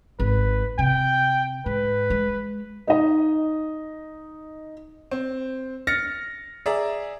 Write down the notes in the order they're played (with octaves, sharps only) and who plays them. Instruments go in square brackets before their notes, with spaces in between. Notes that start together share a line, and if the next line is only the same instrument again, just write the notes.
[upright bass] G#1 [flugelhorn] B4
[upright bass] C3 [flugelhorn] G5
[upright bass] G#2 [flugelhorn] B4
[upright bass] G#3
[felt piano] D#4 D#5
[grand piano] C4
F6 A6 A#6 C#7
G#4 D5 E5 A#5